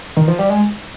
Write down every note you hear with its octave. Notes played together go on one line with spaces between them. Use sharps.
D#3
F3
G3
G#3